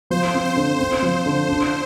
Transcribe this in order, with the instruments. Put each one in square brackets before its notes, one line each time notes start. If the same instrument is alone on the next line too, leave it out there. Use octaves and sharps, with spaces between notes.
[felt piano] F3 [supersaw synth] C5
[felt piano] C4
[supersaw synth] C5
[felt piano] D3
[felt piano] C4 [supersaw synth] C5
[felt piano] F3
D3
D4